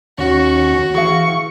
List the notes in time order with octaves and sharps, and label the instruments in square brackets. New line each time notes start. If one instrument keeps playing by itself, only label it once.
[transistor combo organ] D#2 C#4 C#6 [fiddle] F#4
[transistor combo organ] E3 [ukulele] G#4 F5 [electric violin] C#6